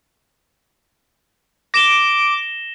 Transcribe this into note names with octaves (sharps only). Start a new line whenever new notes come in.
D6 A#6 E7 G7